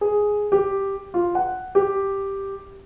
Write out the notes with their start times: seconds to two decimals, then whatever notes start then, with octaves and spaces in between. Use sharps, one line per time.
0.01 G#4
0.52 G4
1.14 F4
1.35 F#5
1.75 G4